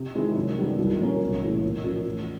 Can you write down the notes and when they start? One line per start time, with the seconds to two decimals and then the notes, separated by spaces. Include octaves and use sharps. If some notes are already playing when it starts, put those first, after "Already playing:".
Already playing: C3
0.15 D#3 G#3 C4 E4
0.36 F#2
0.57 D#3 G3 B3 D4
0.78 C2
0.99 A#2 F#3 A#3 C#4
1.20 B1
1.41 A2 E3 G#3
1.63 A#2
1.84 F3 A#3 C#4 F4
2.06 A1